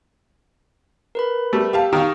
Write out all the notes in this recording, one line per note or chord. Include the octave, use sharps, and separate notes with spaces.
A#4 B4 B5
G3 A3
G4 F5 A5
D#3 G4 F5 G5 A#5 C#6